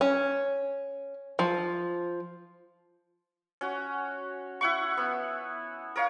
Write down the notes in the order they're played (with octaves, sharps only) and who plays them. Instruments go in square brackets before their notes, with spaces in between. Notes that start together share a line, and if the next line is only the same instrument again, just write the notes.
[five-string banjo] C#4
F3
[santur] C#4 F#4
E4 F#5 C#6
B3
A#4 C#5 F5